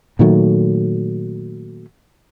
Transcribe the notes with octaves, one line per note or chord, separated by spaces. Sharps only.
A#2 D#3 F#3 A3